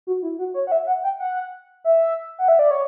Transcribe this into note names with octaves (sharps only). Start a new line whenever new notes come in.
F#4
E4
F#4
C#5
F#5
E5
F#5
G5
F#5
E5
F#5
E5
D5
C#5